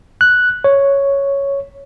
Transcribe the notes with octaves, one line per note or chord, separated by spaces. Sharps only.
F#6
C#5